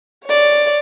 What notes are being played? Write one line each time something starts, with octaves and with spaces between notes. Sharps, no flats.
C#5 D5